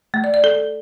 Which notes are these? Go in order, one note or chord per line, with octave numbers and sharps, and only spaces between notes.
A3
D5
D5
A4